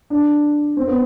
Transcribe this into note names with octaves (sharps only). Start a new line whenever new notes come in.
D4
C4
B3